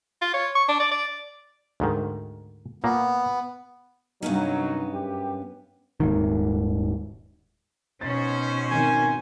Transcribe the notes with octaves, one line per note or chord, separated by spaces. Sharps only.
F4
C#5
C#6
D4
D5
D5
D2 G#2 D#3
A#2 A#3 B3
G2 C3 D#3 F#3 B3 C#4 D#4
F#2 G4
D#1 G#2 D#3
B2 C#4 D#4 C5 A6
G#1 D#3 G#5